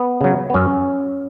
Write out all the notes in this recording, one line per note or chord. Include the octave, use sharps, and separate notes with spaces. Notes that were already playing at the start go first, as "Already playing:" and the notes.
Already playing: B3
C#3 F#3
B3
F#2 C#4